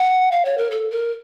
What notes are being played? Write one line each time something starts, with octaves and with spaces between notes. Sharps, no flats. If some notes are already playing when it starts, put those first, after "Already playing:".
Already playing: F#5
F5
C#5
A#4
A4
A#4